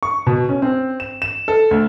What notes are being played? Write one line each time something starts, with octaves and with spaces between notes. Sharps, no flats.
C#6
B2
C#4
C4
E7
E7
A4
D2